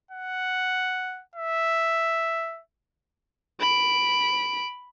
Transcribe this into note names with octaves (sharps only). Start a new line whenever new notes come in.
F#5
E5
B5 D7